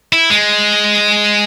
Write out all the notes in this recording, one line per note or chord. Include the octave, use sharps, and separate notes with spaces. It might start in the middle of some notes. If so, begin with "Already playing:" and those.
E4
G#3